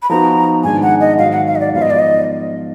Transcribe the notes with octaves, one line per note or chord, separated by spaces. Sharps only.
B5
F3 B3 D#4 F#4 A#5
G#2 D#3 G#3 D4 G#5
F#5
D#5
G#2 D#3 F#3 F5
F#5
F5
D#5
D5
G#2 F3 B3 F4 F5
D#5
D5
D#5